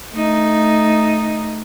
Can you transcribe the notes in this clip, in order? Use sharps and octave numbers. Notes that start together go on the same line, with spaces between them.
A3 D#4